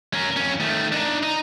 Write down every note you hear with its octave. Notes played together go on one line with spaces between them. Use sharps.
C#4 A#4
F2 C#4
D#3 A3
D4 D#4
D#4